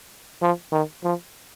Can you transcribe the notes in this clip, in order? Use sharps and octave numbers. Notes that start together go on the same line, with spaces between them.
F3
D#3
F3